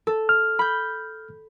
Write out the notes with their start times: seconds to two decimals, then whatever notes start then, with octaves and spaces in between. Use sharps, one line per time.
0.07 A4
0.29 F6
0.59 B5 G6